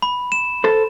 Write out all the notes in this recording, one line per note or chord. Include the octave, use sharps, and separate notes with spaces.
B5
E7
A4 C5